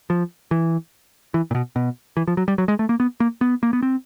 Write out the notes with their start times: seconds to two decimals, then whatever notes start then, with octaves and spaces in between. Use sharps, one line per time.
0.10 F3
0.51 E3
1.34 E3
1.51 A#2
1.55 B2
1.76 B2
2.17 E3
2.28 F3
2.37 F#3
2.48 G3
2.58 F#3
2.68 G#3
2.79 A3
2.89 A#3
3.00 B3
3.20 A#3
3.41 B3
3.63 A#3
3.73 B3
3.83 C4